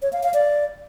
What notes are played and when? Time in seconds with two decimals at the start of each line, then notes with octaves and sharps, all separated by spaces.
0.02 C#5
0.13 F5
0.23 F5
0.34 D5